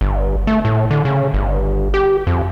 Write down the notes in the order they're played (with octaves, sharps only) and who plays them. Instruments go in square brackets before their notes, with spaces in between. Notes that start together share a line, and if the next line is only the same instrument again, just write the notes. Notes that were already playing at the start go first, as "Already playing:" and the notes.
[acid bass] G1
A3
A2
D3
C#3
G1
G4
F2